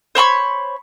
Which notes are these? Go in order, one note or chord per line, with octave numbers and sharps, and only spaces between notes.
C5 C#5 B5 C#6